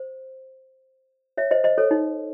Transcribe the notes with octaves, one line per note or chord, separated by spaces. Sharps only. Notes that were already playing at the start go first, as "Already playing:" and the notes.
Already playing: C5
C#5 E5
C5 D#5
C5 D#5
A4 C#5
D#4